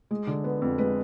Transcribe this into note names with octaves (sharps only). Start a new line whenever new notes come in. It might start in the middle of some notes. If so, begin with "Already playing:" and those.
G#3
D3
B3
F2
G#3 B4